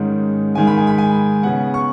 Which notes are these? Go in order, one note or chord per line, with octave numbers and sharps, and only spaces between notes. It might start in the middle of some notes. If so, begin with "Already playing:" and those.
Already playing: G#2 D#3 G#3 C#4
G#2 D#3 G#3 G#5
B5
G#5
B5
G#5
C#3 B3 F#5
C#6